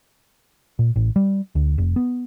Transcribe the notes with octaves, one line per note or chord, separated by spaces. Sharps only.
A#2
A1
G3
D2
F1
B3